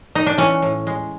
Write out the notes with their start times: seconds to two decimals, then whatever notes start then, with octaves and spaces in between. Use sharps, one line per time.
0.15 D#4
0.26 D4
0.37 E3 C#4
0.62 A2
0.87 G#3